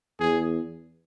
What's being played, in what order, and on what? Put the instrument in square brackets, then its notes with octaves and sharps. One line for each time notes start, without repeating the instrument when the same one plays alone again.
[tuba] E2 [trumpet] G#4